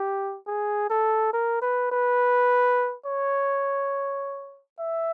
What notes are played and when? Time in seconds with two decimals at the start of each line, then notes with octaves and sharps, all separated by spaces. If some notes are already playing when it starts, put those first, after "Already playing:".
Already playing: G4
0.47 G#4
0.90 A4
1.34 A#4
1.62 B4
1.92 B4
3.06 C#5
4.80 E5